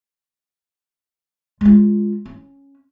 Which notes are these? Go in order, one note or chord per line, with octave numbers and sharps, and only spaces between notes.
G#3 F4
C#4